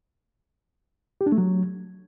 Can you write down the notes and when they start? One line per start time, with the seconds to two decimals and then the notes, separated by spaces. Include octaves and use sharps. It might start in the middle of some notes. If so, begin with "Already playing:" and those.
1.21 G4
1.26 D4
1.32 A3
1.38 F#3